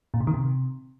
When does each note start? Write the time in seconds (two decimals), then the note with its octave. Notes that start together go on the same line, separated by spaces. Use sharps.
0.14 A#2
0.20 C3
0.27 D#3
0.34 C3